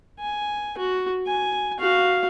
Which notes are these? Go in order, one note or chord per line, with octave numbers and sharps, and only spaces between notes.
G#5
F#4
G#5
F#4 F5